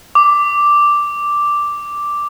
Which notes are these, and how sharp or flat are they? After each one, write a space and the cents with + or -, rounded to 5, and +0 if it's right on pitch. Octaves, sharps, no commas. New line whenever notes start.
D6 +0